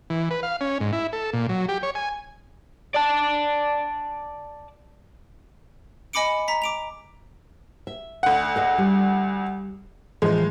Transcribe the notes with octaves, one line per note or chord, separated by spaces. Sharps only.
E3
B4
F5
C#4
G#2
E4
A4
A#2
F#3
G4
C#5
G#5
D5 A5
D#5 G#5 B5 D6 C#7 D7
A#5 B6
D6 D7 F7
E5
D2 F#5
A4 D#5 F5
G3
A2 E3 F3 G#3